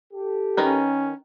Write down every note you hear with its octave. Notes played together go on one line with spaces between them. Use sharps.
G4 A4
D#3 C#4 A#4 B4